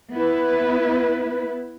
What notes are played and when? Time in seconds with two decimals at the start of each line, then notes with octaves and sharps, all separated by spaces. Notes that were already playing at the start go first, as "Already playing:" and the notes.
0.13 B3 E4 B4